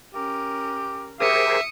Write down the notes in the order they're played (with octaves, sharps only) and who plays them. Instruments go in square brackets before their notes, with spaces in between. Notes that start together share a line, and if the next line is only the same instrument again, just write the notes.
[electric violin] C#4 A#4 [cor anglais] G4
[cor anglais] G4 [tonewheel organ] G#4 A#4 C5 [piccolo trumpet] E5 [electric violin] D#6 C#7